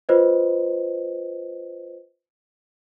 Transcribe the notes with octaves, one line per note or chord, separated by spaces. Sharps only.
F4 B4 C5 D#5